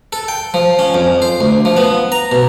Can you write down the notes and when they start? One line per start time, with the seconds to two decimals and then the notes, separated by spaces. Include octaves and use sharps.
0.13 A4
0.28 G5
0.54 F3
0.79 C#4
0.94 F2
1.22 C5
1.41 D2
1.65 F3
1.77 B3
2.12 A#5
2.32 B2